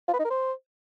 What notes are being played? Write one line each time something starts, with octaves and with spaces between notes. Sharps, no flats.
F4
B4
D#4
A#4
C5